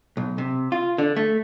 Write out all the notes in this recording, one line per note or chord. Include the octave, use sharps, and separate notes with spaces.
B1
C3
F4
D3
A3